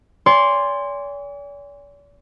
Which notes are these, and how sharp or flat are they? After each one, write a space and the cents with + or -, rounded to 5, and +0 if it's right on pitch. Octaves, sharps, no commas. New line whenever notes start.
D5 -45 G#5 -35 C6 +0